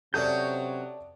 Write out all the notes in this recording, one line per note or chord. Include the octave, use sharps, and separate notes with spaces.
C3 F#3 C#4 A4 D5 D#6 G6